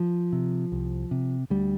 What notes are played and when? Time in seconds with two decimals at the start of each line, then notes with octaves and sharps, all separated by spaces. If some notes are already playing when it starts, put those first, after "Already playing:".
Already playing: F3
0.33 C3
0.72 C2
1.11 C3
1.50 D2 G3